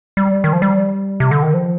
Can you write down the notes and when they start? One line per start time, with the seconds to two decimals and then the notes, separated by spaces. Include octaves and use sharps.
0.17 G3
0.44 D#3
0.53 F3
0.62 G3
1.20 C3
1.31 D3
1.42 D#3
1.54 F3